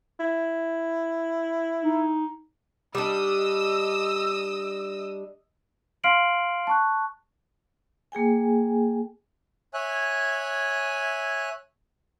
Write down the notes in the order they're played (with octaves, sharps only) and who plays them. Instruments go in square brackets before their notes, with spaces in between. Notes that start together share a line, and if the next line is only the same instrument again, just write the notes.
[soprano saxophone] E4
[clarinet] D#4
[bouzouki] G3 D4 [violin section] D#5 D#6 E6
[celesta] F5 C6 F6 C7 D7 F#7
A5 C#6 F#6
[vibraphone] A#3 G#4 G5 G#5
[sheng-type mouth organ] C#5 E5 G#5 F#6